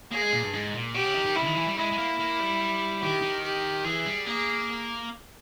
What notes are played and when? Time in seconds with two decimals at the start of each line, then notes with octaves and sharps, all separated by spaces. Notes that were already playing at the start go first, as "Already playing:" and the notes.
0.11 A#3 G#4
0.22 G#3
0.32 A#2
0.42 G2
0.53 G#2
0.74 A#2
0.94 B2 G4
1.05 C#3
1.15 D#3
1.26 D#3
1.36 G3 E4
1.42 C#3
1.46 D#3
1.56 E3
1.67 G3
1.77 G#3 E4
1.92 G#3
1.98 A#3
2.19 A#3
2.40 G3
3.02 D#3 G4
3.22 D#3
3.43 G4
3.84 E3 G#4
4.06 G3
4.26 A#3 G#4